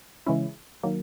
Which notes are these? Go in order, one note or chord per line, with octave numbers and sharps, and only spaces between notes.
C#3 E3 G#3 C#4 E4
D#3 F#3 A#3